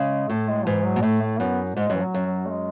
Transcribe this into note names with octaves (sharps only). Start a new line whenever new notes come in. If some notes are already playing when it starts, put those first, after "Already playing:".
Already playing: C#3 G#3
A2 A3
G#3
G#2 E3
F#3
B2
A2 A3
A3
F#2 B3
G#2 G#3
F#2 E3
F#3
F#2
F#3
A3
G#3